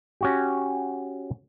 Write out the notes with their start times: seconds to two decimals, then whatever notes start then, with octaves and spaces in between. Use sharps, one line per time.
0.21 C#4 F#4 G4